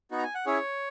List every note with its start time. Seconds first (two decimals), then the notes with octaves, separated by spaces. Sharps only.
0.11 B3 D#4 F#4
0.18 A#5
0.23 G#5
0.35 F#5
0.46 C#4 E4 G#4 C#5